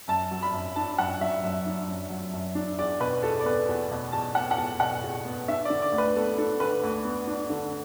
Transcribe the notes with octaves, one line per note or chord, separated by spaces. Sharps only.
F#2 A5
F#3
B5
F#2
D4 A5
F#2 F#5
F#3 E5
F#2
D4
F#2
F#3
F#2
D4
E2 D5
B2 B4
E2 A4
D5
B3 B4
E2
B2
E2 A5
B3 F#5
F#5
E2 A5
B2 F#5
E2
B3
D4 E5
D5
D3
D5
D2
B4
B3 A4
D4 A4
D3 B4
D2
B3
D4
D3